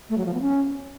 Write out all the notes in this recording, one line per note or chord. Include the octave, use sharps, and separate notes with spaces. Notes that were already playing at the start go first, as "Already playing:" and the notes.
A3
F#3
F3
B3
C#4